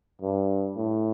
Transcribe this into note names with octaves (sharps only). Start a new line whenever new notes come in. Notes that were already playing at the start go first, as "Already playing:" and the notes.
G2
A2